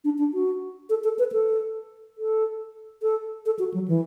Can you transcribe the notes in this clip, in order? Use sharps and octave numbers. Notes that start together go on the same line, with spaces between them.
D4
D4
F#4
A4
A4
B4
A4
A4
A4
A4
F#4
F#3
E3